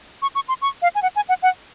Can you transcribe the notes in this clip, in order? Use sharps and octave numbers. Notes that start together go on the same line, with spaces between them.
C#6
C#6
C6
C#6
F5
G#5
F#5
G#5
F#5
F#5